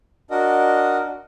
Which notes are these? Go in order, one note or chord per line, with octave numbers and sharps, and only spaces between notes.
D4 F#4 A#4 D#5